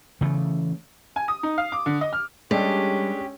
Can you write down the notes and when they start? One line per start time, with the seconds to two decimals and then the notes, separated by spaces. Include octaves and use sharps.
0.21 C#3 E3 A3
1.16 G#5
1.28 D#6
1.43 D#4
1.58 F5
1.72 D6
1.86 D3
2.01 D#5
2.13 F6
2.51 G3 G#3 C#4 D4 G4 A4